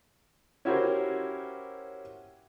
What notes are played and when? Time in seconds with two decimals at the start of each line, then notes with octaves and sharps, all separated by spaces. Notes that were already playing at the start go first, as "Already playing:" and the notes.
0.65 C#4 E4 F#4 G4 A#4 C5